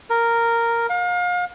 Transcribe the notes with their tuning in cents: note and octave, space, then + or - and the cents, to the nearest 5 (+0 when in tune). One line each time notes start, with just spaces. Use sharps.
A#4 -5
F5 +35